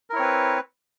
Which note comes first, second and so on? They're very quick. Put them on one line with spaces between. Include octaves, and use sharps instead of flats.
A#4 E4 C#5 C4 B4